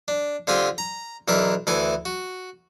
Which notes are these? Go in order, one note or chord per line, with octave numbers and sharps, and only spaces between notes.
D4
D3 C4 F4 G4 G#5
A#5
B1 E3 D4 A#4 E5
D2 E3 E4 A4 G#5
F#4